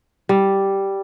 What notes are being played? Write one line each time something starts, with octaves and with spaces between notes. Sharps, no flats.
G3